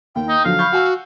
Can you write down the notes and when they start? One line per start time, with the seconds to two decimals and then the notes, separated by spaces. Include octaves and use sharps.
0.15 D#2 G5
0.28 D#4
0.44 D3 F3 F#3 F5
0.59 B5 C#6 G6
0.72 F#4 F#5 G#5 E6